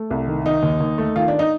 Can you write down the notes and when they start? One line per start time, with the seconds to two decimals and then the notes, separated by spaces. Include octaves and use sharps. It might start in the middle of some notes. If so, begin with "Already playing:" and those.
Already playing: A3
0.10 C2
0.28 D#3
0.45 D#3 D#4
0.63 D#2
0.80 D#2
0.98 A3
1.16 D#3 F4
1.28 D4
1.39 D#4